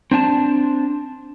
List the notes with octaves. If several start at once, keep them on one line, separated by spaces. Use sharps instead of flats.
C4 D4 G#5 A5